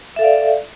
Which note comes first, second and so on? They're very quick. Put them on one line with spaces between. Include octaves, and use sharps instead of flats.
E5 A4 F5 D5